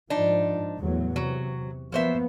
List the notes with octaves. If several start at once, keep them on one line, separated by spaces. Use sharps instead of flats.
G#2 F3 D4 D#4
E2 A2 F#3
C3 F#3
F3 F#3 A#3 B3 C5 E5